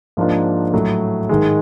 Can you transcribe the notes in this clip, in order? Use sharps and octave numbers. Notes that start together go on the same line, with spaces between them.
G#2 F3 A#3 D4 F4
A2 F#3 A3
G#2 D#3 G#3